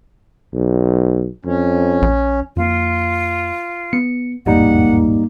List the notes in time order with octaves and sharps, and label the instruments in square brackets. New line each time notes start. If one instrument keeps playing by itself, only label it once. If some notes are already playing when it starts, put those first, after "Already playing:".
[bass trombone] B1
[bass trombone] F2 [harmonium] C#4
[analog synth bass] A#1
[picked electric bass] F2 A#3 [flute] F4
[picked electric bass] B3 [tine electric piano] C#7
[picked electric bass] E1 A1 F2 [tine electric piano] G#2 G3 D#4 [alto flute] A#3 [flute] F#5